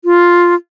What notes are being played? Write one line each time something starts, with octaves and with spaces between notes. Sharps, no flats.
F4